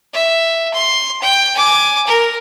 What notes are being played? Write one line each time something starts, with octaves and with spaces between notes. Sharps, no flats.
E5
C6
G5
G#5 D6
A#4